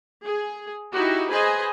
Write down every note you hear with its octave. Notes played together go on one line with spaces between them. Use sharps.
G#4
D#4 E4 F#4 G4
G#4 B4 C5 D#5 G#5